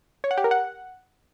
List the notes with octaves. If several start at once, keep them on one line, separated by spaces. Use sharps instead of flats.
C#5
F#5
G4
A#4
F#5